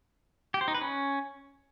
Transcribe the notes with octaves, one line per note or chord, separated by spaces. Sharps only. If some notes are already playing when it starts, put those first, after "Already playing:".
G4
C5
D#4
B4
C#4